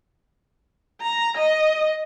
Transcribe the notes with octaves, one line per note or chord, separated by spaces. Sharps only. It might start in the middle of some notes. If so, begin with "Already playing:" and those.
A#5
D#5